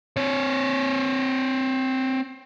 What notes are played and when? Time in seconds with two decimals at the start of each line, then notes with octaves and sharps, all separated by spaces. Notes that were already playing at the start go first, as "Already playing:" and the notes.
0.17 C4 C#5